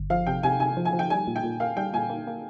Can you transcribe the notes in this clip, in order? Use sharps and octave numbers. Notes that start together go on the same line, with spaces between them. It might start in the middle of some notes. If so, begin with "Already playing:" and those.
Already playing: G1
F3 F5
C3 G5
C3 G#5
C3 G#5
F3
G#5
F3
G5
G3 G#5
A#2
G5
A#2
A#3 F5
G3 G5
A#2 G#5
A#3
A#3